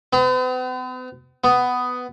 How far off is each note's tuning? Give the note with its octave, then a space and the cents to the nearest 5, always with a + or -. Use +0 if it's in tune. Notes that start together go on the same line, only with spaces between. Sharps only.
B3 +45
B3 +10